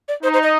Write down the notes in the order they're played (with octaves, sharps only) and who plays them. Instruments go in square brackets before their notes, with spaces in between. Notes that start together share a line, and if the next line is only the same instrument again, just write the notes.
[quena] D5
[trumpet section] D#4 [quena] C5
[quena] C5
D#5